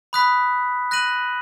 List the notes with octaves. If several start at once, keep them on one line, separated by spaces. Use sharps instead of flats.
B5 D#6 F#6 B6
F#6 A#6 D#7 F#7